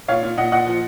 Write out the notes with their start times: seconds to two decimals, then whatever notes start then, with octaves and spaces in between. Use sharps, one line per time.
0.08 A#2 C#5 F5
0.23 A#2
0.37 A#2 D#5 F#5
0.52 A#2 D#5 F#5
0.67 F3